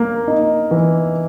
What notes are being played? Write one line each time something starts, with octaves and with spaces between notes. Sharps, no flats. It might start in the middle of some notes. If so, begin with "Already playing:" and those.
Already playing: A#3
D#4
E3